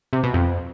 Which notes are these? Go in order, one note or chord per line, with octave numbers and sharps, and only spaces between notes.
C3
B2
F2